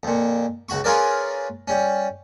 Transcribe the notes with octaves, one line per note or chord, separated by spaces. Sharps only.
F2 A#2
C#2 F#4 B5 C#6
C#4 F4 G#4 A#4 B4 D5
G3 C#4